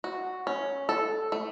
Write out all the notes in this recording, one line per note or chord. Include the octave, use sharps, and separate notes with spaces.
F#4
C#4
A4
A3